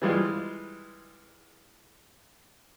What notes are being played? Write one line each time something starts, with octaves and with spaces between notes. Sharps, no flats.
E3 G3 G#3 F4